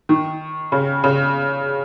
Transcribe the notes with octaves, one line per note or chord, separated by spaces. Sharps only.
D#3
C#3
C#3